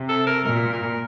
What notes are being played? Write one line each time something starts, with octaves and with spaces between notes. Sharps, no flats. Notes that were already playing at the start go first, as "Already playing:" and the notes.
Already playing: C3
A4
A#4
A#2 A#4
A#4